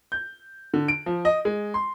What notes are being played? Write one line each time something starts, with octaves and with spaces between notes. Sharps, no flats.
G6
D3
D7
F3
D#5
G#3
C6